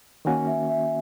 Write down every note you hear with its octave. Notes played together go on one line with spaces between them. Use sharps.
D#3 A#3 C#4 F#4 G#5
E5
E5